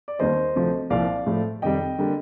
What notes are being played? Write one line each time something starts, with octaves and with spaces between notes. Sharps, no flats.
D5
D#2 D#3 G3 A#3 C5 D#5
D2 C3 F3
C2 A#2 F3 A#3 D5 F5
A2 F3 A3
F2 C3 D#3 G3 D#5 G5
D3 G3 A#3